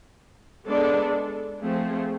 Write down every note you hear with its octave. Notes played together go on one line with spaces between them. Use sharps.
G#3 B3 D4 A4 D5
F3 A3 C4 G#4